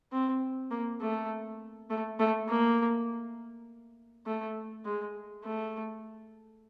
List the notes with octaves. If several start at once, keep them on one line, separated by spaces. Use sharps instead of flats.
C4
A#3
A3
A3
A3
A#3
A3
G#3
A3